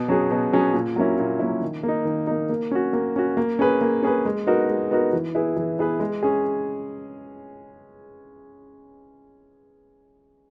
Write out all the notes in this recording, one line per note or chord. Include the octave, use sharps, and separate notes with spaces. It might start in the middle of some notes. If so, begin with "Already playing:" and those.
Already playing: B2
F#3 C#4 G#4
B2
F#3 C#4 G#4
A#2
F#3 A#3 C#4 E4
A#2
F#3 A#3 C#4 E4
D#3
A#3
D#4
D#3
A#3 D#4
A#3
C#4 F#4
A#3
C#4 F#4
A#3
C#4 G#4 B4
A#3
C#4 G#4 B4
G#3
B3 D#4 F#4 A#4
G#3
B3 D#4 F#4 A#4
E3
B3 E4 G#4 B4
E3
B3 E4 G#4 B4
G#3
C#4 G#4